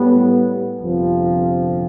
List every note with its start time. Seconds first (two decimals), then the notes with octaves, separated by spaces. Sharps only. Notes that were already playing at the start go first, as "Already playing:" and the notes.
Already playing: A2 G3 B3
0.79 G1 F2 C3 F3